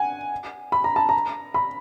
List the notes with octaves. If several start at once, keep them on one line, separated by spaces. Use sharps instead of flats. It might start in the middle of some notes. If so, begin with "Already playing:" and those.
Already playing: F#5 G#5
B5
A#5
A5
A#5
B5